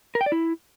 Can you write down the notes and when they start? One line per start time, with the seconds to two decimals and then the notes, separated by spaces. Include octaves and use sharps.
0.15 A#4
0.21 G5
0.26 D5
0.32 E4